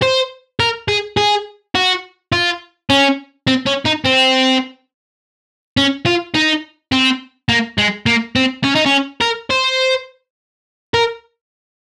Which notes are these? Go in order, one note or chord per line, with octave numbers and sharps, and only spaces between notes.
C5
A#4
G#4
G#4
F#4
F4
C#4
C4
C#4
D#4
C4
C#4
F4
D#4
C4
A#3
G#3
A#3
C4
C#4
D#4
C#4
A#4
C5
A#4